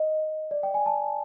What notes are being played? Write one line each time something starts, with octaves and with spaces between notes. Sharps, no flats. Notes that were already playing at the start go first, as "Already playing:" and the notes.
Already playing: D#5
D5
G5
G#5
A5